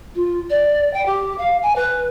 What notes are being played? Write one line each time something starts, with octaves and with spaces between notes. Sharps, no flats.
F4
D5
G5
G4
F5
G#5
B4